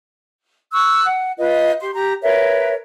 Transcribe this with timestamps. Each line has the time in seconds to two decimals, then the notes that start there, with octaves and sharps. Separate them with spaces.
0.73 C#6 E6 F#6
1.06 F#5
1.38 F4 B4 D#5
1.81 G4 C6
1.94 G4 A#5
2.22 A#4 B4 C#5 E5